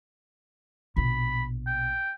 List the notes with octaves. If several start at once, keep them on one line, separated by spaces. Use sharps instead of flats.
A#1 B2 B5
G5